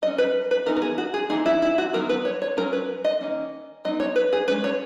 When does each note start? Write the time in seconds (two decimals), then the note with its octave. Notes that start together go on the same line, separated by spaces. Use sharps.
0.02 F#3 D#5
0.07 C#4
0.18 B4
0.51 B4
0.66 E3 B3 D#4 A#4
0.76 A#4
0.82 G#4
0.98 F#4
1.14 G#4
1.29 E3 A#3 D#4 G#4
1.46 E4
1.62 E4
1.78 F#4
1.93 D#3 F#3 B3 A#4
2.09 B4
2.25 C#5
2.42 C#5
2.57 F#3 C#4 A#4
2.73 B4
3.04 D#5
3.21 D#3 A#3 C#4
3.85 F#3 B3 D#4 D#5
4.00 C#5
4.16 B4
4.33 G#4
4.48 G#3 C#4 B4
4.64 C#5